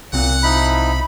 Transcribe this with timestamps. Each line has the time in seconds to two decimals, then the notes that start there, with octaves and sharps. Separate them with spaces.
0.13 C2 A#2 C4 F#5
0.43 F3 D#4 E4 B5